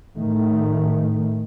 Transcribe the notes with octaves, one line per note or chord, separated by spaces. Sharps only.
A2 D#3 A3